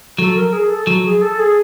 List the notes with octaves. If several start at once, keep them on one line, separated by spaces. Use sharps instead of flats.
F#3 A4
A#4
G#4
A4
F#3
G#4
A4
G#4